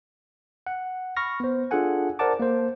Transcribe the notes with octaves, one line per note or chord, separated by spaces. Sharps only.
F#5
B5 C#6 F6 A#6
B3 C5
D4 F4 G#4 A4 F#5 G#5
A#4 C5 D5 F#5 A5 D6
A#3 C5